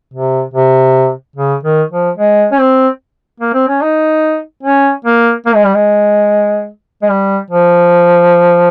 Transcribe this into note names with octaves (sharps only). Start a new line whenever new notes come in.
C3
C3
C#3
D#3
F3
G#3
C#4
C4
A#3
C4
C#4
D#4
C#4
A#3
A#3
G#3
G3
G#3
G#3
G3
F3